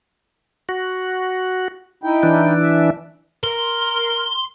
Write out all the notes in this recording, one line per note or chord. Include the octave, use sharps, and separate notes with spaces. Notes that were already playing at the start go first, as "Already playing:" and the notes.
F#4
D#4 E4 G5
E3 D4
E5
A#4 C6